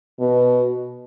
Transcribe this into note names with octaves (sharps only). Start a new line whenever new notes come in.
B2